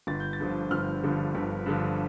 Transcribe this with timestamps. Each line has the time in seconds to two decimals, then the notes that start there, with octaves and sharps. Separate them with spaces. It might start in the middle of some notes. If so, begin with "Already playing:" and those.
0.07 G1 A6
0.20 G6
0.33 A6
0.40 G2 D3 F3
0.71 G1 F6
1.03 G2 D3 F3
1.35 G1
1.66 G2 D3 F3